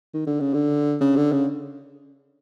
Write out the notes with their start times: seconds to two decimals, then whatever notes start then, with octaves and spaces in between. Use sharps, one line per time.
0.14 D#3
0.27 D3
0.40 C#3
0.54 D3
1.01 C#3
1.17 D3
1.33 C#3